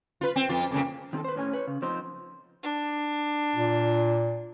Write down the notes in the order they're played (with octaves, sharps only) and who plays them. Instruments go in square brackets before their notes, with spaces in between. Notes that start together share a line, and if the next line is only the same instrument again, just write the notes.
[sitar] F4 B4
C4
F2 F4
F2 C#3 A#3
[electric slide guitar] D#3 C4 G#4 A4
B4 C5
A2 C#4 G#5
B4 C#5
C#3
F3 C4 D#4 C5
[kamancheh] D4
[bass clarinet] A#2